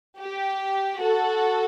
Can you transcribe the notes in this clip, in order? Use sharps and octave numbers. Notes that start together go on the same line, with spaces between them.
G4
F#4 A4